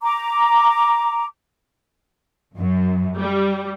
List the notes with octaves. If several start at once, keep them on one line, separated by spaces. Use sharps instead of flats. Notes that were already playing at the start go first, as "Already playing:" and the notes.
A#5 D6
F#2
G3